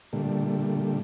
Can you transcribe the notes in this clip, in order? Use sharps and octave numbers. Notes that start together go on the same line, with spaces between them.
A#2 D3 G3 A3